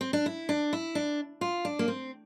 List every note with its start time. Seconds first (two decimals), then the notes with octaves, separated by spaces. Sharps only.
0.01 C4
0.13 D4
0.26 E4
0.49 D4
0.73 E4
0.95 D4
1.41 F4
1.65 D4
1.79 A#3
1.88 C4